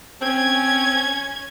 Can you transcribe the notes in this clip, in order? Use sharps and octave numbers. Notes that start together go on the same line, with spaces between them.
C4 C#4 G#6